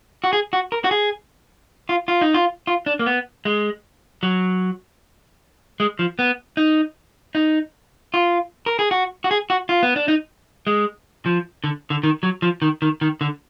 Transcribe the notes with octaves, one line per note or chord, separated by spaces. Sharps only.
F#4
G#4
F#4
A#4
F#4
G#4
F4
F4
D#4
F4
F4
D4
A#3
B3
G#3
F#3
G#3
F3
B3
D#4
D#4
F4
A#4
G#4
F#4
F#4
G#4
F#4
F4
B3
D4
D#4
G#3
F3
D3
D3
D#3
F#3
F3
D#3
D#3
D#3
D3